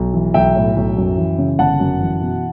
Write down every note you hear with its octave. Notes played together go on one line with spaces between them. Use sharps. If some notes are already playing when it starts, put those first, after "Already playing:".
Already playing: B1
E3
B1 E5 G5
A2
B1
F#2
E3
C#3
G1 F#5 A5
F#2
E3
B2